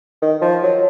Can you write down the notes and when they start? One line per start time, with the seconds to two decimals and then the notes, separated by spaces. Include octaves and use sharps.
0.22 D#3
0.42 F3
0.62 F#3